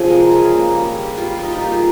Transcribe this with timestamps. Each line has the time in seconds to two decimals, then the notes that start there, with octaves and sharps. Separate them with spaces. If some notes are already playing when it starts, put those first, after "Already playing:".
Already playing: C3 F3 F4 G#4
0.10 G#3 A#4
0.31 C#3 G#4
0.53 A#3
0.74 G3
0.96 G3
1.17 G3 F4
1.39 G3 D#4
1.53 F4
1.60 A#3 G4
1.72 G#4